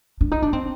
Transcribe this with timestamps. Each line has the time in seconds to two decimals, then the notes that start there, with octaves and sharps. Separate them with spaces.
0.21 D4
0.32 D#4
0.42 D4
0.53 C4